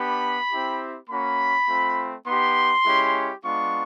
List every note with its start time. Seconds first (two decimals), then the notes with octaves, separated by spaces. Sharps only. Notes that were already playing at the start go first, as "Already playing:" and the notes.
Already playing: B3 D4 G4 B5
0.51 C4 E4 G4
1.09 A#3 C#4 F#4 B5
1.68 A3 C4 F4
2.27 B3 D#4 G4 C6
2.84 G#3 C#4 E4 G4
3.43 G#3 B3 D4 F4 C#6